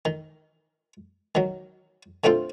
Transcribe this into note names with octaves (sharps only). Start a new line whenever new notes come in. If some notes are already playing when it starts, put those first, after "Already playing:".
D#3
D#3 F#3
D3 A3 C4 F4 C5